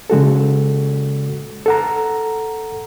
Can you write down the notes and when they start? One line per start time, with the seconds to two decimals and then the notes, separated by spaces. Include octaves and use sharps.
0.10 C#3 G#3 F#4 A4
1.66 A4 F#5 A#5